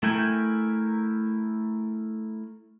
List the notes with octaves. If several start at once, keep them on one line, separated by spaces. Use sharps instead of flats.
A3 E4 A#4 G5 G#5